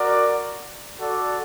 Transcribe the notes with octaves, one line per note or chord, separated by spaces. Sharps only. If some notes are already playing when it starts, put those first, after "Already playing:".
Already playing: F#4 A#4 D5
F#4 A4 D5